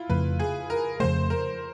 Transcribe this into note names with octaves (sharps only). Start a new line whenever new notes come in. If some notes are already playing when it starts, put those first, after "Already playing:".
Already playing: E4 F4
F2 C#3 F3 A3 B4
G#4
A#4
F2 C#3 F3 A3 C5
A#4